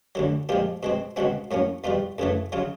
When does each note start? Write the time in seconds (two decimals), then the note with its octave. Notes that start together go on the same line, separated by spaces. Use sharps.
0.15 D2 D3 F#3
0.49 A#2 F3 G#3 G4
0.83 B2 G#3 C4
1.16 C#2 B2 G#3 C4 F#4
1.51 A2 F#3 A#3 C#4
1.84 E2 B2 G3 F4
2.18 F#2 C#3 E3 A3
2.52 C#3 F#3 F4